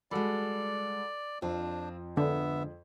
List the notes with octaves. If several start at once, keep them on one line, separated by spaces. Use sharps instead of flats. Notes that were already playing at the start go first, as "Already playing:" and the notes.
G3 G#3 F#4 A4 D5 B5
F2 F3 C4 D4 F4
G#2 D3 B3 E5